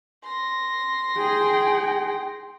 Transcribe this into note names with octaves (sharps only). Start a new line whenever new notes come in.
C6 A#6
G#4 G5